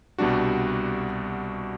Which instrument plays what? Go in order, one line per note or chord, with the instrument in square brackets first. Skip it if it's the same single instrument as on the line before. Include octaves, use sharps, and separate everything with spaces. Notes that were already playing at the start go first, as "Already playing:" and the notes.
[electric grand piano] C2 B2 G3 D4 F#4